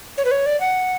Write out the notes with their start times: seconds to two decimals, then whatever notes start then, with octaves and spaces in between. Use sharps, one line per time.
0.18 C#5
0.25 B4
0.31 C#5
0.46 D5
0.61 F#5